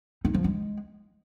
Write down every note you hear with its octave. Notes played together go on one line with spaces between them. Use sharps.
D#4
F3
G#3